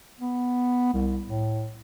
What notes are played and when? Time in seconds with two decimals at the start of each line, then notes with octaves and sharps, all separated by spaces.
0.20 B3
0.93 C2
1.26 A2